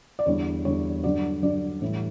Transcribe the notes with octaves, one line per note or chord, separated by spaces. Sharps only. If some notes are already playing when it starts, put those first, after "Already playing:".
D5
E2 D3 G3 C#5
E2 D3 G3 C#5
G2 D3 F#3 D5
G2 D3 F#3 D5
A2 E3 G3